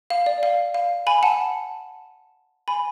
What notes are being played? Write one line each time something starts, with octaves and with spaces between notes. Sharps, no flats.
F5
D5
F5
F5
G#5 B5
F#5 A5
G#5 B5